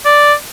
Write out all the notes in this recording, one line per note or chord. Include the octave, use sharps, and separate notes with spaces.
D5